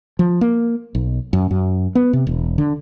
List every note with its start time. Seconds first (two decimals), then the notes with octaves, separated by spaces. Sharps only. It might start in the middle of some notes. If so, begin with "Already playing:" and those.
0.19 F3
0.41 A#3
0.95 B1
1.33 F#2
1.51 F#2
1.95 B3
2.13 C3
2.27 E1
2.58 D3